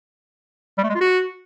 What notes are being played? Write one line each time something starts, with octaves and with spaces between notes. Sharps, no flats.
G3
A3
G#3
F4
F#4